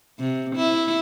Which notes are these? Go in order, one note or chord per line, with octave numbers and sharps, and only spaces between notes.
C3
E4